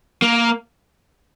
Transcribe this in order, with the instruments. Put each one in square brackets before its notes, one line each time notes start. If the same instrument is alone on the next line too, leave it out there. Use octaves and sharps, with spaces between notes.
[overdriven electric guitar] A#3